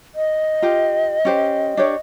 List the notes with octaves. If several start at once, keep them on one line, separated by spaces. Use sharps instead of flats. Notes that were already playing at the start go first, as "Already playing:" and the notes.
D#5
F4 G4
C#4 G4 C5
D4 G4 C#5